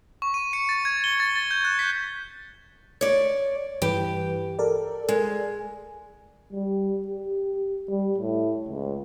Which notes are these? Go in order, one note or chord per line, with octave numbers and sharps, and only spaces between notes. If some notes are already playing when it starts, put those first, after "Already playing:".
C#6
D#7
C#7
A6
G#6
G7
A6
A6
G6
F#6
B6
C#5 D5
G2 E3 G4 B4
A4 A#4 D5
G#3
G3
G4
G3
A2
C#2